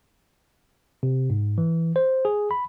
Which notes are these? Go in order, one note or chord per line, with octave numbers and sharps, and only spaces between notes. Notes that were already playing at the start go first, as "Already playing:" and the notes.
C3
G#2
E3
C5
G#4
B5